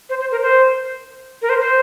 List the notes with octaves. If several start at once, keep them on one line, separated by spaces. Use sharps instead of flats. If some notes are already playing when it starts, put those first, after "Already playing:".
C5
C5
A#4
C5
A#4
C5
C5